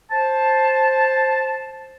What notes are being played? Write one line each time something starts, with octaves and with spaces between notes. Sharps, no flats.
C5 A5